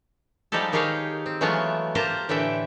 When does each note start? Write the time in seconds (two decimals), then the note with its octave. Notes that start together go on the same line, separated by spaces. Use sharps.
0.52 F3 G3 G#3 D#4 G4 A4
0.73 D#3 D#4 G4 G#4 C#5 F5
1.26 C4
1.41 E3 F#3 G#3 A3 B3 F4
1.95 A#3 F4 G4 C5 A5 A#5
2.29 A2 D3 E3 E5 G5